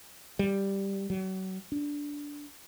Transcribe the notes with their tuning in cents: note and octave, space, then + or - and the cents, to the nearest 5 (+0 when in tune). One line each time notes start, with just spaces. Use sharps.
G3 +0
F#3 +35
D4 -10